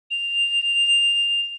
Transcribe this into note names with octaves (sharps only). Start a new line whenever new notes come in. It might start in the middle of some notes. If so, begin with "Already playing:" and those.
F7